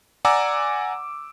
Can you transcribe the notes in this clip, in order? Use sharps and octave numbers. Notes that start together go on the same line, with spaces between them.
D5 F#5 G#5 A#5 D6 E6